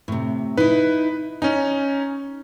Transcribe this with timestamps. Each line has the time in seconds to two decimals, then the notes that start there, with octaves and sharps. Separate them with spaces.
0.08 A2 C3
0.57 D#4 E4 B4
1.42 C#4 D#4 G#5